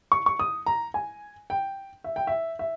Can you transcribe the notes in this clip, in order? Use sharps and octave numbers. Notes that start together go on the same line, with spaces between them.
C#6
C#6
D#6
A#5
G#5
G5
E5
G5
E5
E5